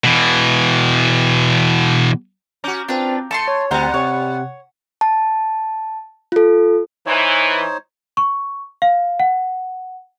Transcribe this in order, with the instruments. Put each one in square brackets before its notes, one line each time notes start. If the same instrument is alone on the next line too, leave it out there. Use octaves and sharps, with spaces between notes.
[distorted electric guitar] B2 E3
[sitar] C#4 F#4 [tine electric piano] A#5 D6 G6
[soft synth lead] C4 [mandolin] D4 B4 [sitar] F4
[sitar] A3 [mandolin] A5 B5 C6 [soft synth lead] C#7
[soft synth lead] C#5
[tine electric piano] D2 C4 [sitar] G3 B3 [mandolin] C5 A#5 [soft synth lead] F#5
[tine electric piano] C3 [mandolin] C#5
[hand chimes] A5
F4 A4
[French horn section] E3 [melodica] D#4 C5 C#5
[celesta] C#6
F5
F#5